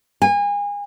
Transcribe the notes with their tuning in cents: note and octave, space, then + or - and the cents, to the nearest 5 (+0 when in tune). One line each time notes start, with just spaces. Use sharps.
G#5 -30